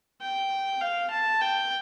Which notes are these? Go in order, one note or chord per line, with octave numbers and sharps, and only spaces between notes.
G5
F5
A5
G5